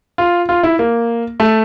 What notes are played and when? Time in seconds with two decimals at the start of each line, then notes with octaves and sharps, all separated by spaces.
0.18 F4
0.49 F4
0.63 E4
0.79 A#3
1.40 A3